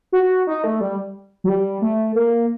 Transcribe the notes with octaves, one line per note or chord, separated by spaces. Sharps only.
F#4
D#4
A3
G3
F#3
G3
A3
A#3